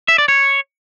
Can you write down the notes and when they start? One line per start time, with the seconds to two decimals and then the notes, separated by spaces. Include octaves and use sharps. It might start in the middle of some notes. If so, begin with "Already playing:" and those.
0.08 E5
0.18 D5
0.28 C#5